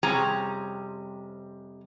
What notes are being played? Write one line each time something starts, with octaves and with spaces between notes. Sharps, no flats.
F2 C3 G3 C#4 G#4 A#5